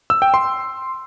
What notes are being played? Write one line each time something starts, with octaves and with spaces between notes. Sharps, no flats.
E6
G5
C6